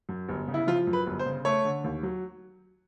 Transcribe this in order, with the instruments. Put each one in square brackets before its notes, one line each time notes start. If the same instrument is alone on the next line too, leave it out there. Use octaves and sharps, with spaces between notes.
[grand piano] F#2
G1
C#3
E4
F3 F4
F#2
B4
G1
C5
C#3
A3 C#5
D3
D#2
F#3